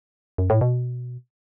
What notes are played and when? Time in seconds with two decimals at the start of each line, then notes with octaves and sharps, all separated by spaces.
0.38 F#2
0.50 A2
0.61 B2